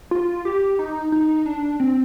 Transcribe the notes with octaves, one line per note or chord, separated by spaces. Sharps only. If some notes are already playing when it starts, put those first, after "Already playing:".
F4
G4
D#4
D#4
D4
C4